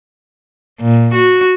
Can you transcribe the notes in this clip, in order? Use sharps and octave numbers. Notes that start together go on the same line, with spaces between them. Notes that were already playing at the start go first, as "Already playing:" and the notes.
A#2
F#4